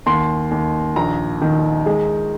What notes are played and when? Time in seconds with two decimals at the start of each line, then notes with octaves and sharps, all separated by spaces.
0.06 D#2 C6
0.51 D#2
0.96 A#1 A#5
1.41 D#3
1.86 G#3